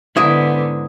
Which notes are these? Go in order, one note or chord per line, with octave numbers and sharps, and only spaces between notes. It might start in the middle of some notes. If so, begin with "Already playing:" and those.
G#2 D3 B3 E4 D#6